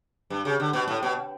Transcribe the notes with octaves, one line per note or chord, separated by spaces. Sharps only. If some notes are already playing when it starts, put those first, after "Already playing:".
G2
C#3
D3
B2
A2
B2